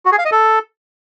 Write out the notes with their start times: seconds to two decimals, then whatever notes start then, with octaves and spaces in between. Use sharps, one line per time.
0.05 F#4
0.12 G#4
0.19 F5
0.25 D#5
0.32 A4